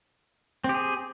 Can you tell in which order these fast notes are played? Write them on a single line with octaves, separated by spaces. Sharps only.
C4 G4 G#4